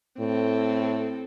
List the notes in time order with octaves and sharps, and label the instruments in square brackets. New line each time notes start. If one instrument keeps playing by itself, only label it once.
[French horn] A2 [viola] C4 A4